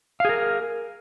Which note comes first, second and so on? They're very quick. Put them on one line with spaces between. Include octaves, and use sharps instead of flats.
F5 G#4 A#4